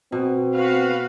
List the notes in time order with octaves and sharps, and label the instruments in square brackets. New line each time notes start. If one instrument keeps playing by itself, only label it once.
[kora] B2 [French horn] C4
[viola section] F#4 B4 F5